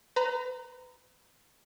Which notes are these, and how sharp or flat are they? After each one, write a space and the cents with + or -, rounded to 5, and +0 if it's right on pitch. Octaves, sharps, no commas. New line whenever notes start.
B4 +40 A#5 +0